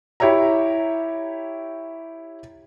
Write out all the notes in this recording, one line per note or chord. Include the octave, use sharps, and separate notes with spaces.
E4 G4 C#5 E5 A#5